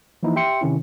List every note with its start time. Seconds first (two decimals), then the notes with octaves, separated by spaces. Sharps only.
0.23 E3 F3 A#3 D#4 E4
0.36 G4 E5 G5 C6 C#7
0.61 C3 D#3 C#4 E4